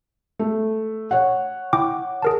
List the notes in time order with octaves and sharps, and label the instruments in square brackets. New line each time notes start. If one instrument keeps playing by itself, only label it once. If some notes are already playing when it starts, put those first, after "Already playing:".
[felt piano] A3
C#5 F#5
[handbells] E4 G5 D6
G#4 A#4 A5